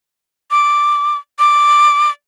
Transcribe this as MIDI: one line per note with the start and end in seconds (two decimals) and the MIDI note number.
0.51 1.18 86
1.39 2.11 86